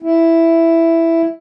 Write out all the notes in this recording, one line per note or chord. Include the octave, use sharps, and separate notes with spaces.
E4